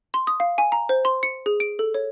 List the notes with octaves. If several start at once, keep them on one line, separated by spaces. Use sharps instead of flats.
C6
D#6
F5
G#5
A#5
C5
C6
C#7
G#4
D7
A4
C#5